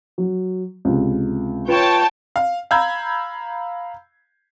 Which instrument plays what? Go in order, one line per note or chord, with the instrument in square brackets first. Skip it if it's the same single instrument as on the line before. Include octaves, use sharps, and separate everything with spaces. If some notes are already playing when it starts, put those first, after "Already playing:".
[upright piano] F#3
C#2 C3
[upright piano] F4 B4 [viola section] C#5 G5 A5
[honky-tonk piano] F5
F5 A#5 B5 E6 G6 G#6